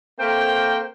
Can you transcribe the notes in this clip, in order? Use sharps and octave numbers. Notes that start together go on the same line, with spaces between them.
A3 A#3 C4 C5 G5